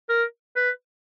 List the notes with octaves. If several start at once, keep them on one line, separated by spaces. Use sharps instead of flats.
A#4
B4